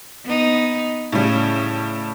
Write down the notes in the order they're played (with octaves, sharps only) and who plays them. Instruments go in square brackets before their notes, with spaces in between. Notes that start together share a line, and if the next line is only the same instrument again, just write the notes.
[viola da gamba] B3 D#4
[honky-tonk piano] A2 G3 [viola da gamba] C#3